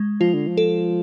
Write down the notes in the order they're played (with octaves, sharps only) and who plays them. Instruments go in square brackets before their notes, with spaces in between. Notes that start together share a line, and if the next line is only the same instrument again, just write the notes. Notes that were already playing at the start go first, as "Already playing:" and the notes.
Already playing: [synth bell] G#3
[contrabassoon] F3 [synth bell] F4
[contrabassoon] D3
F3
[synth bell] A4